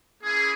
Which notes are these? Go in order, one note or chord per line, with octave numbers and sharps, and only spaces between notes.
A#3 C#4 E4 G#4